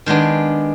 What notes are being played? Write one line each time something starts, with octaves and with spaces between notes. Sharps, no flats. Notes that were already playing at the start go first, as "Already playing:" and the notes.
D#3 G#3 B3 D4